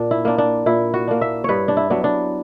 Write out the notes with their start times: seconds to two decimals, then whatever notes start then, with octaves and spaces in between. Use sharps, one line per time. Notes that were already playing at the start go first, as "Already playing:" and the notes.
Already playing: A#2 D4
0.11 E4
0.25 A#3 D4
0.38 D4
0.66 A#2 E4
0.94 F#4
1.08 A#3 D4
1.21 E5
1.44 G2 B4 C#5
1.68 D4
1.77 E4
1.90 F#3 B3 D4
2.04 D4